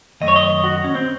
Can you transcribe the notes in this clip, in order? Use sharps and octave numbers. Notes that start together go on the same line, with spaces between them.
F#2 D#3 A3 D#5
C#5
D#5
F#4
C#4
C4